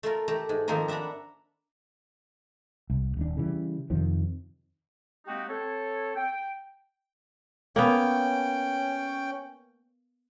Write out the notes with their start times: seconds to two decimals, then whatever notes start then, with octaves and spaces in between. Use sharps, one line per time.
0.03 A3 F4 A#4
0.28 A3 G4 A#5
0.49 G#2
0.68 D#3 F3 A#3 C4 D#4 F4
0.88 D4 E5 F#5 A#5 B5
2.90 C2
3.17 D#1 D4
3.37 C#3 E3 G3
3.90 F2 C3 D#3 F3
5.26 G#3 A#3 C4 D#4 F#4 G4
5.48 C4 A4 C#5
6.15 G5
7.76 A#3 B3 C#4 G5